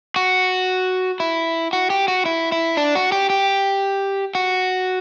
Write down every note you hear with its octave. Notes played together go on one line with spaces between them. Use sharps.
F#4
E4
F#4
G4
F#4
E4
E4
D4
F#4
G4
G4
F#4